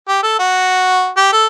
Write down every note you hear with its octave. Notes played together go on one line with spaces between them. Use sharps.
G4
A4
F#4
G4
A4